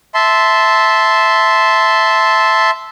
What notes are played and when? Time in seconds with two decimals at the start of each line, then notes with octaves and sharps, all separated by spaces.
0.14 E5 A5 C6